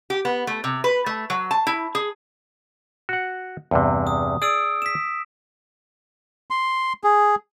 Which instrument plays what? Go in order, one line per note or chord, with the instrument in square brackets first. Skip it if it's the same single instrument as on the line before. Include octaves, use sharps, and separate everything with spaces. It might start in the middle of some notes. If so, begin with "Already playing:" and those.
[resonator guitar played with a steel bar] G4
B3
A3
C3
B4
A3
F#3
A5
E4
G#4
[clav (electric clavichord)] F#4 F#5
E2 G2 C3
[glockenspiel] D#6
[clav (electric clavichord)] G#4 D5 [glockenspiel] D#6 E6 D7
[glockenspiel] B6 E7
[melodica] C6
G#4